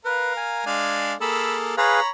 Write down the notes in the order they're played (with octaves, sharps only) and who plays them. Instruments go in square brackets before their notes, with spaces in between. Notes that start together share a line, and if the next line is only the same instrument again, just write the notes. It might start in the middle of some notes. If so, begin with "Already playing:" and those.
[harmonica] A#4 F5 [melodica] B4
[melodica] G#5
[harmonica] G#3 D4 F5
[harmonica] A#3 G#4 A4 [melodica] B5 E6
[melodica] G#4 B4 F5 [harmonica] C#5 A#5 B5